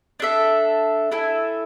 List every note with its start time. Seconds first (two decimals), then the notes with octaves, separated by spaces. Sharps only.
0.20 D4 A4 E5
1.12 E4 A4 E5 G#5